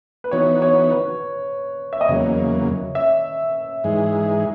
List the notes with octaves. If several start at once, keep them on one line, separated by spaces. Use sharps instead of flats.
B4
E3 B3 D#4 F#4 C#5
C#5
B4
E5
D#5
E2 C#3 F#3 A#3 C#5
E5
G#2 E3 G#3 D#4 G#4